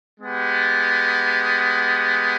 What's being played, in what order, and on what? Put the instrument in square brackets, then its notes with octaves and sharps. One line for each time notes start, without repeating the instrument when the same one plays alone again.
[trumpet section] G#3 B3 G4